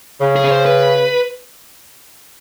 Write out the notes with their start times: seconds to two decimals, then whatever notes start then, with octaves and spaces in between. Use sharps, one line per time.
0.20 C#3
0.36 G#4
0.44 C#5
0.52 C5
0.66 B4